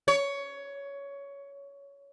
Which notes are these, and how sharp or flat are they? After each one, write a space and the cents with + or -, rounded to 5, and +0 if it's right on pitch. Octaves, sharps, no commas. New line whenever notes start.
C#5 +15